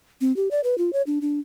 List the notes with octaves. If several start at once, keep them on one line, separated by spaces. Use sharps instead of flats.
C4
G4
D5
B4
F4
C#5
D4
D4